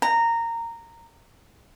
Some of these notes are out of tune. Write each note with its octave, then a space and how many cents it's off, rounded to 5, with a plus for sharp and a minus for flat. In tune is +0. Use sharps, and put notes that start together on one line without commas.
A#5 -15